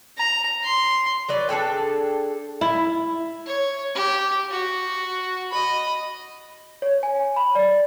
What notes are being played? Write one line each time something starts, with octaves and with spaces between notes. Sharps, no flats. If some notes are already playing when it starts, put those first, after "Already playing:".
A#5
C6
F#3 B4 D5
D4 G#4 A4 G5
E4
C#5
G4
F#4
D#5 B5
C#5
G#5
B5
D5